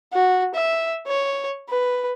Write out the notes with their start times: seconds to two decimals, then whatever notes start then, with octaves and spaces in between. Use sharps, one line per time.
0.13 F#4
0.55 E5
1.07 C#5
1.69 B4